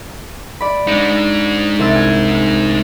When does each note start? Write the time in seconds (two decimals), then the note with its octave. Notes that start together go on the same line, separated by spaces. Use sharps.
0.61 D5 B5
0.87 G#3 D4 D#4 C#7
1.79 C2 E6 A6
1.95 G#5